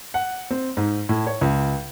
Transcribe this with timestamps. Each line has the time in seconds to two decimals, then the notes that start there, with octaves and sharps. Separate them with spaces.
0.14 F#5
0.50 C4
0.77 G#2
1.09 A2
1.27 C#5
1.41 C#2